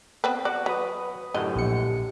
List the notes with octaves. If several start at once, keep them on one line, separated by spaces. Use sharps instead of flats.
B3 C4 B4
F#4 D5
F#3 B4 B5 D#6
F#2 A2 D3 G4 D#5
A#1 C#7